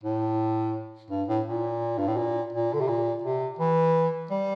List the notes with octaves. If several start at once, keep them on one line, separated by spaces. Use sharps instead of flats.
A2
G2
A2
A#2
G2
A2
A#2
A#2
D3
C3
A#2
C3
E3
G3